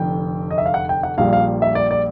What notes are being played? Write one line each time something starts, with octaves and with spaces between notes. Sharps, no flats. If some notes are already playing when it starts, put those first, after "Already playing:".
Already playing: F1 F2 D3 G5
D#5
E5
F5
F#5
G5
F#5
A#1 A#2 G3 F5
F5
E5
D5
D5